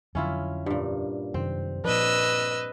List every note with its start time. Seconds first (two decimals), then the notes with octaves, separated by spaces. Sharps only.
0.15 F2 D3 F#3 C#4 E4 F4
0.66 G2 A#2
1.34 F#2 C3 D#3 C4
1.84 A#2 F3 D4 B4 D#5 E6